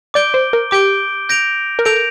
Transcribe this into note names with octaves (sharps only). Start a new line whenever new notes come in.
D5 D6 G6 D7 G7
C5
A#4
G4 D6 G6 D7 G7
G6 A#6 D7 F7
A#4
A4 G6 A#6 D7 F7